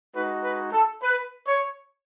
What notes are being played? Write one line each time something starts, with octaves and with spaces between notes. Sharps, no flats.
G#3 D#4 F#4 B4
B4
A4
B4
C#5